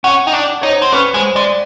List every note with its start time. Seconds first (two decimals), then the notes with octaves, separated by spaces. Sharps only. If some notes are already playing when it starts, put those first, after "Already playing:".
0.04 C#4 F#5
0.26 D#4 G5
0.33 D4
0.61 D#4 C#5
0.69 C5
0.82 C4
0.92 C#4 B4
1.14 G#3 C5
1.36 G#3 D5